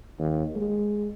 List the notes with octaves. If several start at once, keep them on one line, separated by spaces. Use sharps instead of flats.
D#2
G#3